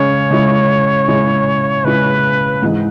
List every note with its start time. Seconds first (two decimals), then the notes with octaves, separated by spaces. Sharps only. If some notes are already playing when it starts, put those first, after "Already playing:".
Already playing: C#3 G#3 C#4 C#5
0.30 C#3 G#3 C#4 E4
1.08 C#3 G#3 C#4 E4
1.84 C#3 G#3 C#4 E4 B4
2.62 G#2 E3 G#3